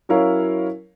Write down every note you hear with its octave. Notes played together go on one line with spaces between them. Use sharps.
F#3 C#4 E4 A#4 C#5 F5